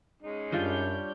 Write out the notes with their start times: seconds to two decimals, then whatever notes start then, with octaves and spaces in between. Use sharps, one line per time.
0.22 G#3 C#4 D#4
0.52 F#2 G3 D4 F4 C#5 D5 G6